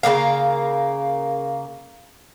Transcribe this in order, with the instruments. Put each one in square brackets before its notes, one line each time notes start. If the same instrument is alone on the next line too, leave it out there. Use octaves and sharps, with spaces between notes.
[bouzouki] C#3 F#3 A#3 F5